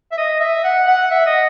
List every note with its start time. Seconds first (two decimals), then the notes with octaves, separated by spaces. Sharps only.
0.12 E5
0.18 D#5
0.40 E5
0.64 F#5
0.87 F#5
1.11 E5
1.26 D#5